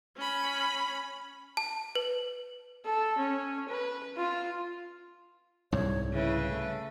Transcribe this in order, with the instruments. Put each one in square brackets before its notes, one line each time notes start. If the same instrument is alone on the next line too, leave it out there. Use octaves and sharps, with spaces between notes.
[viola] C#4 B5
[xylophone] A5
B4
[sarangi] A4
C#4
B4
F4
[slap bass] C2 G#2 [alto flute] C#5
[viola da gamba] C#3 B4 [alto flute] E4
[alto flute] A3